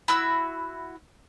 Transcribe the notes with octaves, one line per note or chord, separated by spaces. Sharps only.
E4 F#4 E6